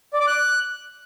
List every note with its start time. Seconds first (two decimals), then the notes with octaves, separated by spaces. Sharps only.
0.13 D5
0.20 D6
0.27 F#6